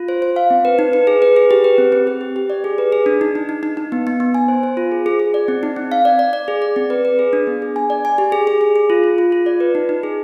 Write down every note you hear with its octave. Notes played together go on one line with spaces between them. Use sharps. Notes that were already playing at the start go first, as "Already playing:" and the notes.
Already playing: F4
C5
C5
F5
C4
B4
D#4
B4
G#4
B4
G#4
G4
B4
C4
C4
G4
G4
G4
D5
G#4
B4
G#4
D4
D#4
D#4
D#4
D#4
D#4
B3
B3
B3
G#5
C5
C5
F4
G#4
G#4
G#4
D5
C4
D#4
C4
F5
D5
D5
D5
G#4
D5
C4
B4
B4
G#4
D4
B3
G#4
G#5
D5
G#5
G4
G#4
G#4
G#4
G#4
F4
F4
F4
F4
D5
B4
D#4
D#4
G#4